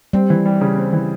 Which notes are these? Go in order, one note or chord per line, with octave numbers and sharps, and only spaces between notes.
G3 C4
E3
G3
C#3
C4
E3